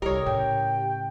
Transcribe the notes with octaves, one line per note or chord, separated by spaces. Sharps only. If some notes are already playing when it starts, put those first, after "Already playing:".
C2 G2 G3 G4 A4 A#4 C#5 D#5
A2 C#3 G5